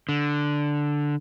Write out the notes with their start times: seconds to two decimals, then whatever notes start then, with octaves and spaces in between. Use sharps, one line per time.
0.09 D3